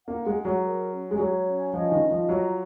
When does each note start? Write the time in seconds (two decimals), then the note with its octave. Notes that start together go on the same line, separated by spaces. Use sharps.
0.07 A#3 F#5
0.26 G#3
0.35 G#4
0.45 F#3
0.63 A#4
0.91 C#4
1.11 G#3
1.18 F#3 C#5
1.46 C#4
1.73 F3 D#5
1.92 D#3
2.01 F4
2.10 F3
2.29 F#3 A#5